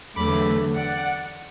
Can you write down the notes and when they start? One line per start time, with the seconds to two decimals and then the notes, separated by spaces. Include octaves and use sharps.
0.16 E2 D3 F#3 A3 B5 D6
0.74 D5 F#5